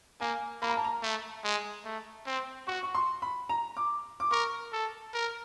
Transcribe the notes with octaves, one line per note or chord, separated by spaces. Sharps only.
A#3 G#5
A#3 B5
A#5
A5
A#5
A3
G#3
A3
C4
F#4 C#6
C#6
C6
B5
A#5
D6
D6
A#4 C#6
A4
A#4